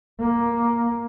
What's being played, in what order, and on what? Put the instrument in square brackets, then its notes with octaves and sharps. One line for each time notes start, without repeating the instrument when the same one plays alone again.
[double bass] A#3